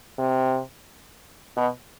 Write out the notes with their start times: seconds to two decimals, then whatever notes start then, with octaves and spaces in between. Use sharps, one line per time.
0.18 C3
1.57 B2